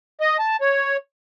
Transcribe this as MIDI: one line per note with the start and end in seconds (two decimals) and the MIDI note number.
0.21 0.37 75
0.39 0.56 81
0.61 0.97 73